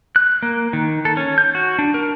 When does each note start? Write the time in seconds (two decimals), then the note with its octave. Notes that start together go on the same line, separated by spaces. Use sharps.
0.16 F#6
0.42 A#3
0.73 D#3
1.05 A4
1.17 C#4
1.38 G6
1.55 F#4
1.79 D4
1.94 A#4